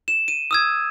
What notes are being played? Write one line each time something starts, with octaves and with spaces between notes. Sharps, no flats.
E7
D#7
D#6 E6 G#6